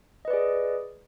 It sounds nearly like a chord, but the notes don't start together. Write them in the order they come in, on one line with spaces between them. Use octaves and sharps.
D#5 B4 D5 G#4